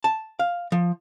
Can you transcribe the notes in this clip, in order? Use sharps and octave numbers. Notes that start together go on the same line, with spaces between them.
A5
F5
F3